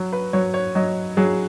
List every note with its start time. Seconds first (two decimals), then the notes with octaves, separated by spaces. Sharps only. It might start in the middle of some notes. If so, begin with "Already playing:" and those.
Already playing: F#3
0.13 B4
0.33 F#3 C#5
0.54 C#5
0.75 F#3 D#5
1.17 F#3 G#4